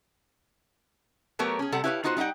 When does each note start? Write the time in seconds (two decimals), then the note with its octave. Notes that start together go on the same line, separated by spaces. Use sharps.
1.39 F#3 A3 B3 G4 A#4 C#5
1.59 C#4 G#4
1.72 C3 G3 A4 F#5
1.84 E4 G4 B4 C#5 D5 F5
2.04 B3 D#4 F4 F#4 A#4 C5
2.17 G3 D#4 E5 F#5 G5